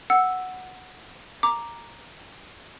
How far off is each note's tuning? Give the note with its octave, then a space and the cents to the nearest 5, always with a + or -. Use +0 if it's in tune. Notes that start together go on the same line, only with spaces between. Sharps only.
F#5 +0 E6 +0
A#5 +0 D6 +0